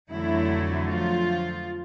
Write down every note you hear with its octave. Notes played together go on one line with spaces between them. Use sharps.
F2 D3 E3 F#3 A3 E4
F3 F4